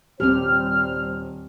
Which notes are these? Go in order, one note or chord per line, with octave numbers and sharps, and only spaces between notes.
D#1 G3 C4 G4 C5 F6